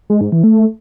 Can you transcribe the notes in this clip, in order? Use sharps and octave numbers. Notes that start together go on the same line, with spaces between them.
G#3
G#2
E3
A3